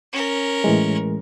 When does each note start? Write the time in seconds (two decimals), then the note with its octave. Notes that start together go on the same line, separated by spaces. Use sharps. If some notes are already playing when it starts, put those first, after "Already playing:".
0.13 C#4 A#4
0.64 A2 E3 G#3